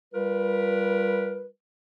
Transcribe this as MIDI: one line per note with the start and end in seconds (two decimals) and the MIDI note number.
0.14 1.48 55
0.14 1.48 65
0.14 1.48 70
0.14 1.48 71